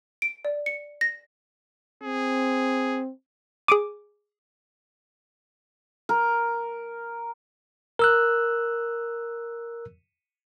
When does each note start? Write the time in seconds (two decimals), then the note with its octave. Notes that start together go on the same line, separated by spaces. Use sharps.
0.22 D7
0.45 D5
0.66 C#7
1.01 A#6
2.03 C4 G#4
3.68 G#4 D6 D7 D#7
6.09 A#4
7.99 A#4 E6 F#6